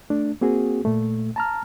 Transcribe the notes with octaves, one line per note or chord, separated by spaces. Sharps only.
A3 D4
A#3 C4 F#4 G#4
A#2 A3
A5 A#5 F6